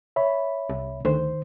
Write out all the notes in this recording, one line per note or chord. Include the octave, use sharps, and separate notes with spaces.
C#5 E5 B5
C2
D2 D#3 C5